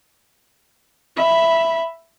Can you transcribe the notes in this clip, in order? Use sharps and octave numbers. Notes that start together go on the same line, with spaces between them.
E5 B5